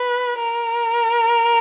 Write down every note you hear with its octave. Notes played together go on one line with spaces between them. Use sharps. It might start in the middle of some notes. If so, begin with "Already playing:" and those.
Already playing: B4
A#4